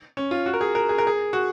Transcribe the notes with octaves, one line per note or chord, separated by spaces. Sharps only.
C#4
F4
F#4
A#4
G#4
A#4
G#4
A#4
G#4
F#4